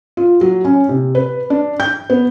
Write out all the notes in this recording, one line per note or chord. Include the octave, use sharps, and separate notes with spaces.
F4
F#3
C#4
C3
B4
D4
G6
B3